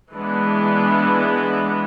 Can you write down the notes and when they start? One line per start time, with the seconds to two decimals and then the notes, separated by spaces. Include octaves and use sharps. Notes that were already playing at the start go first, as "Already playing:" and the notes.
0.13 E3 G#3 B3 D4